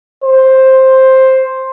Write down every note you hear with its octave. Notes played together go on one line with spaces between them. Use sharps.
C5